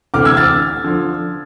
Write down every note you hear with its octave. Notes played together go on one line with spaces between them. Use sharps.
D2 C3 E3 A3 D6 F6
E6 G#6
F6 A6
D3 F3